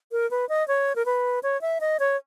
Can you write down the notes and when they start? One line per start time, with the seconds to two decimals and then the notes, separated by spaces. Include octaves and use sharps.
0.12 A#4
0.31 B4
0.49 D#5
0.68 C#5
0.96 A#4
1.06 B4
1.43 C#5
1.61 E5
1.81 D#5
2.00 C#5